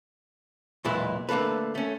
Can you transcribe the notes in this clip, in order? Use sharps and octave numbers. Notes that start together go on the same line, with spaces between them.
B1 E2 A#2 G#3 E4 B4
D3 A3 A#3 A4 B4
A3 C#4